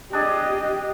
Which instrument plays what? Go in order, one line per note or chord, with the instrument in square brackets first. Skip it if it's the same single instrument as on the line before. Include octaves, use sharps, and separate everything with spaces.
[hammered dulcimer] D4 G#4 [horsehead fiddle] G4 D#5